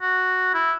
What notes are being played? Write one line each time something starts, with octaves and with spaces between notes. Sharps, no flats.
F#4
E4